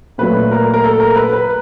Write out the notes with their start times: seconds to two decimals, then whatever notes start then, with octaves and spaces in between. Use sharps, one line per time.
0.18 A#2 F#3 A3 B4
0.51 A#4
0.74 A#4
0.84 A4
1.00 A#4
1.16 B4
1.33 B4